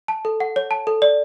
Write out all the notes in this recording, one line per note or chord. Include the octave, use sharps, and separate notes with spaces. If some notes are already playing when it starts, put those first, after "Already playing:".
A5
A4
F#5
C#5
A5
A4
D5